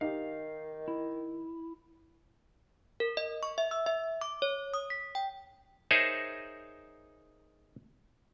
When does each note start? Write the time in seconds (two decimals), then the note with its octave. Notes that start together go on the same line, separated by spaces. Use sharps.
0.01 D#3 D#4 G4 F5
0.88 E4
3.00 A#4
3.17 D#5
3.43 C#6
3.58 E5
3.71 E6
3.86 E5
4.21 D6
4.42 C#5
4.74 D#6
4.90 B6
5.15 G5
5.91 D#4 G#4 A#4 C5 C#5 E5